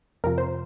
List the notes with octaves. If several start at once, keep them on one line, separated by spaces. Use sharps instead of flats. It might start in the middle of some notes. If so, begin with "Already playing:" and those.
F2 C3 F3 A#4
C5